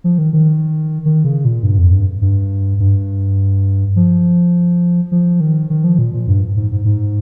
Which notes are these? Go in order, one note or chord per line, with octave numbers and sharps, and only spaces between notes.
F3
D#3
D#3
D#3
C#3
A#2
G2
F2
G2
G2
G2
F3
F3
D#3
D#3
F3
A#2
A#2
G2
G#2
G#2
G#2